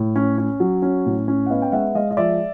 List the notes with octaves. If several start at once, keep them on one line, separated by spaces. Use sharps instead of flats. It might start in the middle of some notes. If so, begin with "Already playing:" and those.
Already playing: A2
C#4
C#4
F#3
C#4
A2
C#4
F#5
B3 D#5 F5
G5
G#3 E5 F#5
G#3 D#5 F5
D#5
F3 D5 E5